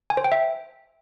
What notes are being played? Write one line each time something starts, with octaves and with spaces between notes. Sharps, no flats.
G#5
C5
G5
E5